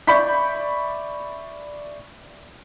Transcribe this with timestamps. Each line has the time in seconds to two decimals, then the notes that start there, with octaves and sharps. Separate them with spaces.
0.07 D5 E5 B5 C#6 G6 B6